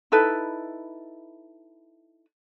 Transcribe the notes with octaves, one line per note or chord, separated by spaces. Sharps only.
D#4 E4 A4 B4